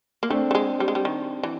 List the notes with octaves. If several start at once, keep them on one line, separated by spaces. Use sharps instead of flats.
A#3
A3 C4 D4
A3
G#3
G3
G#3
G3
D#3
E3